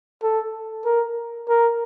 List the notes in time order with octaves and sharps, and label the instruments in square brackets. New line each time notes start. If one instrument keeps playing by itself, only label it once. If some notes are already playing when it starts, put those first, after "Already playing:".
[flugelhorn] A4
A#4
A#4